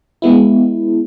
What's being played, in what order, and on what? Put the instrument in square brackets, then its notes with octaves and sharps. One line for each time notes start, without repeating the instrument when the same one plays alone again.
[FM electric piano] G#3 B3 E4